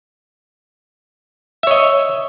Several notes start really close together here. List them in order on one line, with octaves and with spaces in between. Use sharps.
E5 C#5 D#5